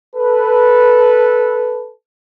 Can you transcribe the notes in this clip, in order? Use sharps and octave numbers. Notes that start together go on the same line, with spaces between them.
A4 B4